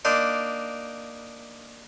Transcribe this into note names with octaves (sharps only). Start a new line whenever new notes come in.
A#3 D4 D#4 D5 C6